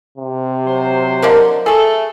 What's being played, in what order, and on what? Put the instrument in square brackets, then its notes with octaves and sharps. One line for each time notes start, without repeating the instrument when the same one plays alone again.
[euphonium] C3
[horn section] F#3 C5
[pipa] D3 A#3 D4 [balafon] A#4 D#5
[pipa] A3 G#4 [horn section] A4